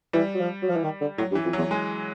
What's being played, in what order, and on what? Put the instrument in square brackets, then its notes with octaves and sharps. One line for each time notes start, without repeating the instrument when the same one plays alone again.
[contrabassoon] E3 [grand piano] G3
[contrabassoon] F#3
F3
F#3
F3
E3
D#3
D3
[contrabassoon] A2 [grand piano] F#3
[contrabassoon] G2
[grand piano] E3
[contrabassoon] F2
[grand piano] F#3
[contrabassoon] E2
[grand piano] G#3